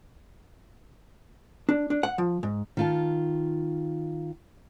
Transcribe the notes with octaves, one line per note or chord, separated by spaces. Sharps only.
D4
D4
F#5
F3
G#2
D#3 F4 A5